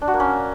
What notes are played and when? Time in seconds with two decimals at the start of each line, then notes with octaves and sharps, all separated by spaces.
0.01 D4
0.08 F#4
0.14 A#3
0.20 C#4